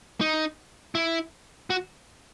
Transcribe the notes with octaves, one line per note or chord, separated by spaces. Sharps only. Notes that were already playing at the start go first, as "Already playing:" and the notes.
D#4
E4
F#4